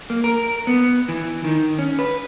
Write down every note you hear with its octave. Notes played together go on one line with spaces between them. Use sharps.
A#3
A#4
B3
E3
D#3
C#4
B4